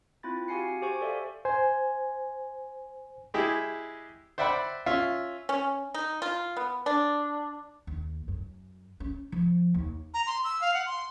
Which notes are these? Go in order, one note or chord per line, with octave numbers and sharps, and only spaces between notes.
C4 E4 F4 B5 A6
F#4 G4 F5 G#5 C7 C#7
G4 C5 G#5 C#6
A4 D5 E5 F5
C5 G#5
G#3 E4 G4 G#4
C5 D5 E5 F#5 G5 B5
C#4 F4 E5
C#4
D#4
F4
B3
D4
D#2
F#2
C#4
F3
D#2
A#5
C6
E6
F5
F#5
C6